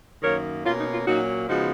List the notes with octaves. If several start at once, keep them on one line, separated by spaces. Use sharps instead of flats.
F#2 D#3 A#3 A#4 C#5
B2 A#3 C#4 F4
D#4
F4
A#2 F#3 A#3 C#4 D#4 F#4
C#3 F3 G#3 B3 D#4 F#4